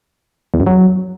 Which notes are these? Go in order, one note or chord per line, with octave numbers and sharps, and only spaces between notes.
E2
F#2
F#3